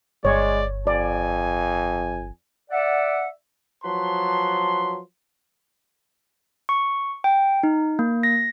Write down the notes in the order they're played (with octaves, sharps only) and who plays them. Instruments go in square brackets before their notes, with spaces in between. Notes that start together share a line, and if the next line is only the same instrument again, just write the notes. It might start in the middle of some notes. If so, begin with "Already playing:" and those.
[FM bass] G1 [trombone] G#3 [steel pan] C#5 [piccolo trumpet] D5
[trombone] F2 [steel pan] D5 [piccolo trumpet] G#5
[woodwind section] D5 E5 F#5
[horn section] F3 F#3 B4 A5 C6
[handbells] C#6
G5
D#4
A#3
A#6